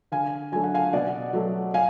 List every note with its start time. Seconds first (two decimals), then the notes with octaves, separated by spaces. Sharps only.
0.12 D3 F5 G#5
0.52 F#3 A3 D4 G#5
0.64 F#5
0.74 F5 G#5
0.93 B2 D5 F#5
1.33 F#3 A3
1.74 F5 G#5